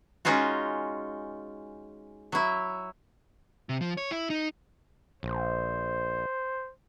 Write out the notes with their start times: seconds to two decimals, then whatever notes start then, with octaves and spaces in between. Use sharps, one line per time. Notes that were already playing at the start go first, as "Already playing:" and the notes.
0.25 G#3 C#4 D#4 F4 F#4
2.32 F#3 E4
3.69 C3
3.81 F3
3.97 C#5
4.11 E4
4.30 D#4
5.23 A#1 C5